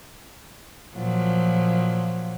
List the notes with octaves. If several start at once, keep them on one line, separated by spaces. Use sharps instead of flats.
A#2 F3 F#3